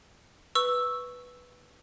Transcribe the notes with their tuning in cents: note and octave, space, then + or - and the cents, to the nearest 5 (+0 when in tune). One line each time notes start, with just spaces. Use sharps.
B4 +0 C#6 +0 E6 +0